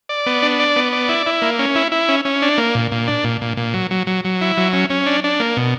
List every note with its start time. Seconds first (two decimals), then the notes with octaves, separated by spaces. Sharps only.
0.09 D5
0.26 B3
0.42 D4
0.60 D5
0.76 B3
0.92 D5
1.09 E4
1.26 E4
1.42 A#3
1.59 C#4
1.75 E4
1.92 E4
2.09 C#4
2.25 C#4
2.42 D4
2.58 A#3
2.75 A#2
2.92 A#2
3.07 D4
3.24 A#2
3.41 A#2
3.57 A#2
3.74 F#3
3.91 F#3
4.07 F#3
4.25 F#3
4.41 E4
4.57 F#3
4.73 C#4
4.90 C#4
5.06 D4
5.24 D4
5.40 A#3
5.57 B2